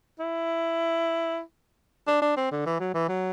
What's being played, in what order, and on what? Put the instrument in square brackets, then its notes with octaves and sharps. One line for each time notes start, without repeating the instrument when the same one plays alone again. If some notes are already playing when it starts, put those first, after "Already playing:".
[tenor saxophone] E4
D4
D4
C4
D3
E3
F#3
E3
F#3